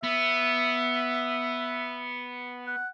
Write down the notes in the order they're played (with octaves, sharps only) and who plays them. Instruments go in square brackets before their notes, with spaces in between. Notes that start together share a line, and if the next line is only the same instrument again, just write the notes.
[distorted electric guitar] B3 [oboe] E5
[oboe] F#5